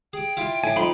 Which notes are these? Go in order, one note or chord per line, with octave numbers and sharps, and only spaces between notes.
G#4 G5
E4 F4
A2 G#5
F2 D#4 B5 C6